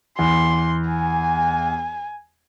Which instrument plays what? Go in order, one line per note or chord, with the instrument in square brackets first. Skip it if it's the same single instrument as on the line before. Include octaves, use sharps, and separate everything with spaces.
[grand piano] E2 [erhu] C6
[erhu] G#5